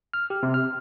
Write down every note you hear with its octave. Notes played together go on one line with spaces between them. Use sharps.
F6
G4
C3
F6